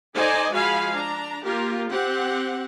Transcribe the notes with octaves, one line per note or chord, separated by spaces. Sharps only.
D#4 A4 C5 D5 D#5 G#5
F3 G#3 F#4 F5 G#5 B5
D4 A#5
A#3 F4 G4 A#4
C4 G4 F#5